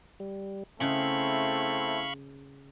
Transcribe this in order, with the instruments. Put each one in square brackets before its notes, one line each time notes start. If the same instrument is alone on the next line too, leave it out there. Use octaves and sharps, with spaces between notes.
[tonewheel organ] G3
[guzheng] C#3 C#4 [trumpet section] A3 C4 E4 [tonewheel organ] F5 B5 C#6